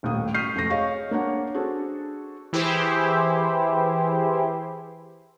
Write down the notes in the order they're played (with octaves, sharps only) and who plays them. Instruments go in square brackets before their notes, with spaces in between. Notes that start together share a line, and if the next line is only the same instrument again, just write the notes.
[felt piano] D#1 D#2 A2 D#6
C#6 F6 G6 B6 C7 D#7
F1 A3 C#6 A#6
G#4 C#5 D#5 F5 C#6
A#3 D4 C#5 F#5
D4 F#4 G#4 A4 C5
[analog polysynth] E3 E4 G4 G#4 C5